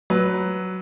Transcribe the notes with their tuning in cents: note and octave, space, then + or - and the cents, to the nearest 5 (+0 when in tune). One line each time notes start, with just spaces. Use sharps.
F#3 +10 B4 +0